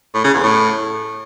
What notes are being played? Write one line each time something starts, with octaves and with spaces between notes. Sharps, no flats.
A2
C#3
E2
A2